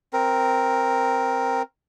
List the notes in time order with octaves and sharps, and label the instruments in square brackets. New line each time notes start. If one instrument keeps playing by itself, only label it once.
[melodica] C4 A#4